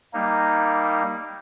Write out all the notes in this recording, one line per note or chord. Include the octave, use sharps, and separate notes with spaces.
G3 A#3 D#4